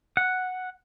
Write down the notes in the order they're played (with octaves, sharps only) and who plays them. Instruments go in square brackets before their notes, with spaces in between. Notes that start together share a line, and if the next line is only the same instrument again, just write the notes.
[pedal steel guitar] F#5